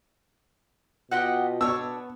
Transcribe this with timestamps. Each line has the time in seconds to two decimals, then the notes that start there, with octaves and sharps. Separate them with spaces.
1.11 B2 F4 G4 D#5 F#5
1.61 B3 D4 C#5 E6